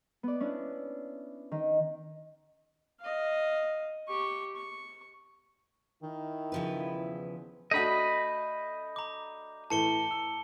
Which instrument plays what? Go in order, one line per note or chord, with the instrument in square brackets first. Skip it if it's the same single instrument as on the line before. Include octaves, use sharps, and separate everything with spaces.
[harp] B3 D5
C#4 D4 E4
D#3
[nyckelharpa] D#5 F5
G4 C#6
C#6
[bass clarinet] D#3 [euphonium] D#4 [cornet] E4
[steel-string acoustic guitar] C#3 F3 B4
[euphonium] E2
[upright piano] A3 D4 F#4 [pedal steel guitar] D#5 B5 [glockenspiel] G6
[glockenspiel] A#5 D6
[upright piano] A2 E3 A3 [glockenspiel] A5 C#7 G7
[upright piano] E6